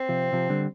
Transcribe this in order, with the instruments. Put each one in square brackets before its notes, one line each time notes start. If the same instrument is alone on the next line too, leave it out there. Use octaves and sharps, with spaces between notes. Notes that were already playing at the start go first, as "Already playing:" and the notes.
Already playing: [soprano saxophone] C4
[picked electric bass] C3 F3
C3 F3
D3 G3